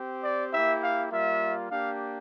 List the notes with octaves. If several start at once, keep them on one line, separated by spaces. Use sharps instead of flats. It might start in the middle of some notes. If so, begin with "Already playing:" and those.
Already playing: C4 G4
D5
A#3 E4 G4 E5
F5
G3 A#3 F4 E5
A#3 D4 G4 F5